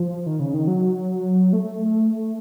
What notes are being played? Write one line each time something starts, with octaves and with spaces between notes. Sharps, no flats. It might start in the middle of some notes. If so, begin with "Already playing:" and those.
Already playing: F3
D#3
C#3
D#3
F#3
A3